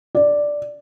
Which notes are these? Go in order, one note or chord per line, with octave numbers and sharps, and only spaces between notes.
D5